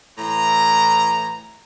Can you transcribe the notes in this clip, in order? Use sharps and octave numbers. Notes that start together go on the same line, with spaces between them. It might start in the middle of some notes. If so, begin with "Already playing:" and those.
A2 E3 A#5